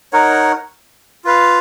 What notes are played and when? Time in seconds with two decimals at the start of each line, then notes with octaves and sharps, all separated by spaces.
0.13 D#4 A#4 C#5 F#5
1.24 F4 B4 F5